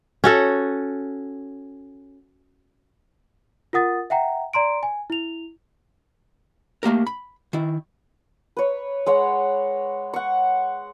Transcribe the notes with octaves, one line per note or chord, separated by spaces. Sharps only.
C#4 F#4 A4
F4 A#4 F#5 D#6 A6
E5 F#5 G5 A#5
D5 A#5 C6 D7
G#5
E4 F7
A3 A#3 G4 A#4
B5
D#3 E4
B4 C#5
G#3 C#5 F#5
F#5 C#6